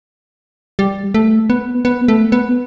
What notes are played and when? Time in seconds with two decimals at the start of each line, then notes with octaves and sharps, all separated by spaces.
0.79 G3
1.14 A3
1.50 B3
1.85 B3
2.08 A3
2.32 B3